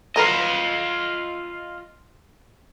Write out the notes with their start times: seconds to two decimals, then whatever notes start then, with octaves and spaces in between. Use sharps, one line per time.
0.16 F#3 F4 A#4 B4 D#5